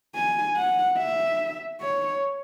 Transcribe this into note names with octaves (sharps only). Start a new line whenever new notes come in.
G#5
F#5
E5
C#5